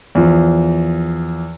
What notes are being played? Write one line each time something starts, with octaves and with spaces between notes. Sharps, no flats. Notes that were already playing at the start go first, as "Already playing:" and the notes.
E2 F3